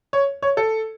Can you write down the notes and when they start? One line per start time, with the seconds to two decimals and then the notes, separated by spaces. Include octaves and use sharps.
0.13 C#5
0.42 C#5
0.57 A4